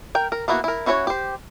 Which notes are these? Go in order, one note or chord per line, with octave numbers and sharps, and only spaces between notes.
A#4 G5
A#4
A#3 B3 E4 F#4
E4 A#4
C#4 E4 F#4 B4 C#5
G4 C5